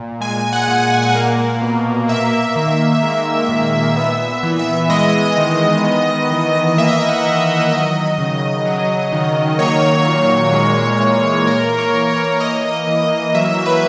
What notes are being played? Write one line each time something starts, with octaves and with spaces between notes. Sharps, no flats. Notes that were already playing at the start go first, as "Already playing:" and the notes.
Already playing: A#2
G#3 G#5
F#5
A#2
A#3
B2
A#3 E5
D#3
G#3
A#2
B3 E5
E3
E5
G#3 D#5
D#3
B3
E3
A#3 E5
D#5
E5
F#5
D#3
E5
F#3 D#5
C#3
F#3
D#3
A#3 C#5
A#2
G#3
E3
A#3 A#4
C#5
E3
C#5
A#3 D#5
E3
F#3 E5
B4